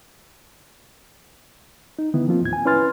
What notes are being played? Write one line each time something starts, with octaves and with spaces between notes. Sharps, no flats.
D#4
D3 D#3 B3 E4
F3 A#3 C4 F4
D#2 A2 G#6
G#5
C#4 E4 B4 C6 F6 A6